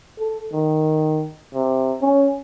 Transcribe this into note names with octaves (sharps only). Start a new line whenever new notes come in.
A4
D#3
C3
C#4